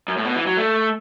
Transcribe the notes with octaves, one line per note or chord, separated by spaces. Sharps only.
F#2
A2
B2
E3
F#3
A3